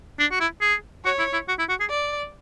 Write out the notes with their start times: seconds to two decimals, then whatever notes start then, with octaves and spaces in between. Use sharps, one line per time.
0.19 D4
0.32 F#4
0.40 E4
0.61 G#4
1.05 F#4 C#5
1.19 E4
1.33 E4
1.48 F#4
1.59 E4
1.69 F#4
1.80 G#4
1.90 D5